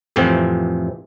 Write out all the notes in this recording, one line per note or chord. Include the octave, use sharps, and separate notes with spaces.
F2 A2 C3 E3 F3 C4